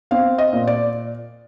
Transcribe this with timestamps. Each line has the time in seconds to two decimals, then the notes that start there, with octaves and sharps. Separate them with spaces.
0.11 C4 F5
0.38 D#5
0.53 A#2
0.67 D5